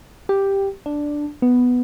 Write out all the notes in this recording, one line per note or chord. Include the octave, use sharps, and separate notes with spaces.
G4
D4
B3